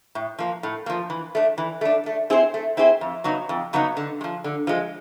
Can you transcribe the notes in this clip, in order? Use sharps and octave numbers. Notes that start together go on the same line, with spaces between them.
A2
F3 A#3
A2
F3 A#3
E3
A3 D4
E3
A3 D4
A3
C4 E4 G#4 C5
A3
C4 E4 G#4 C5
F2
C#3 F#3 B3 D#4
F2
C#3 F#3 B3 D#4
D3
G#3
F3
D3
F3 G#3